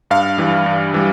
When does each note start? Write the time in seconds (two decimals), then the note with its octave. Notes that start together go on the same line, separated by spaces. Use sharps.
0.11 G2 F5
0.38 E3 G3
0.66 G2
0.94 E3 G3